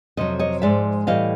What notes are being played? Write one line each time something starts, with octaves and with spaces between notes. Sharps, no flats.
F2 C3 F#3 D#5
C#5 D#5
G#2 F3 G#3 D5 E5
A2 E3 G3 D#5 F5